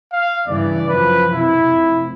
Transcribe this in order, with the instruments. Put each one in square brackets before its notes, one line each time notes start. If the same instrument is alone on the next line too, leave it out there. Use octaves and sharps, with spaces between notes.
[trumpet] F5
[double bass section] G2 C#3 E3 [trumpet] D5
[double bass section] F#2 F3 [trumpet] B4
[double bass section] C3 [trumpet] E4
[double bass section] F1